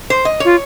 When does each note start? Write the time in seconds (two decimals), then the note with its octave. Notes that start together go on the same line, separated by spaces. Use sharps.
0.10 C5
0.25 D#5
0.40 F4 C#5